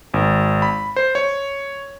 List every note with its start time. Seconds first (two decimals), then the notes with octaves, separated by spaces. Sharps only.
0.14 G#1
0.62 B5
0.96 C5
1.15 C#5